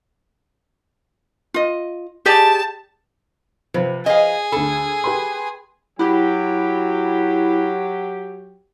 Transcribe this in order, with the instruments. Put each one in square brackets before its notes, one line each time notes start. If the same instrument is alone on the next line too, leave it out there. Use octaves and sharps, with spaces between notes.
[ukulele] F4 D#5
[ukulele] G4 G#4 D5 [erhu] A5
[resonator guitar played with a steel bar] C3 [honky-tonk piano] F3 B4
[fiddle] G#4 [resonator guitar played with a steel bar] D#5 F5
[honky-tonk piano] D2 B5 [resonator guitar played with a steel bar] A4
[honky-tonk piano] G4 B4 C6
[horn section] F#3 G4 [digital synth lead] E4